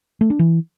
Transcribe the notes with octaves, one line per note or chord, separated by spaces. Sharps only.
A3
D4
E3